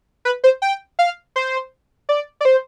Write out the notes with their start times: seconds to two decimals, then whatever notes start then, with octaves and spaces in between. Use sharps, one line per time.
0.25 B4
0.44 C5
0.62 G5
0.99 F5
1.36 C5
2.09 D5
2.41 D5
2.45 C5